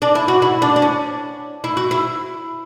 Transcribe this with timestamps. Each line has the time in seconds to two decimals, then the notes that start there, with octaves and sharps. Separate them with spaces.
0.02 D4
0.15 E4
0.28 F#4
0.42 E4
0.62 D4
0.76 D4
0.82 C#4
1.64 E4
1.77 F#4
1.91 E4